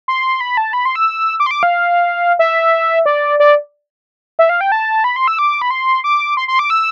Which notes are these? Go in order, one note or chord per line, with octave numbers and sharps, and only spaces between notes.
C6
B5
A5
B5
C6
E6
D6
C6
D6
F5
E5
D5
D5
E5
F5
G5
A5
B5
C6
E6
D6
B5
C6
D6
C6
C6
D6
E6